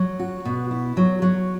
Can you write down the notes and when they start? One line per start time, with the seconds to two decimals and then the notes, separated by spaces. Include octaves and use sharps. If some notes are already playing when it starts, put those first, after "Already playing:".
Already playing: F#3
0.19 F#4
0.45 B2
0.71 E4
0.97 F#3
1.22 F#3